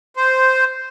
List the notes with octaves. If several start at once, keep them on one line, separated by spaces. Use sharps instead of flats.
C5